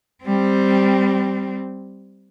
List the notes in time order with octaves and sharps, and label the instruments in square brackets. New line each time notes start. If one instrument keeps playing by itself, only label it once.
[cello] G3 C4